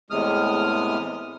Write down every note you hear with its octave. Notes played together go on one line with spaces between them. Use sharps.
E2 A2 C3 G#3 D#6 F6